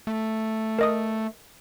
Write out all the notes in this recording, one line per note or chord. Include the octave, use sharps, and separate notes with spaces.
A3
A#4 D#5 D#6